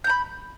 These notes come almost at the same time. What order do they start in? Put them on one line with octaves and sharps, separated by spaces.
G6 A#5 B5